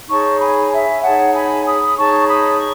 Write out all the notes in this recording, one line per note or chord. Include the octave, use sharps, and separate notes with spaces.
D#4 G#4 C#5 A5 C#6
G#5 B5
E5 G#5
D#4 G#4 C#5 F#5 A5
G#5 B5
B5 D#6
D#4 G#4 C#5 A5 C#6
B5 D#6
C#6